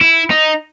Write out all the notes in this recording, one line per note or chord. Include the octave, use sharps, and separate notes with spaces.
E4
D#4